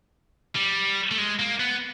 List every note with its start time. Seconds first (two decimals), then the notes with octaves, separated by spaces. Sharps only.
0.55 G3
1.11 A3
1.18 G#3
1.39 A#3
1.60 B3